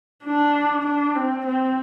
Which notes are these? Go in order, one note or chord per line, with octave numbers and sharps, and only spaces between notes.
D4
D4
C4
C4